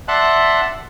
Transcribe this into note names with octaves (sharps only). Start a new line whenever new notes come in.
D5 E5 F#5 A5 C6 F#6